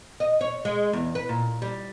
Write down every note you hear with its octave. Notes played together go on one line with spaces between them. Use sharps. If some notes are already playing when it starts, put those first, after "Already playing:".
D#5
C#5
G#3
E2
B4
A#2
G3